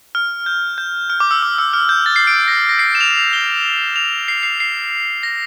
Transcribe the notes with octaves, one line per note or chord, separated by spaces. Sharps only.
F6
G6
G6
F6
D6
E6
D6
E6
F6
G6
A6
C7
D7
A#6
A#6
A#6
C7
E7
F7
F7
G7
F7
C7
C7
C7
A#6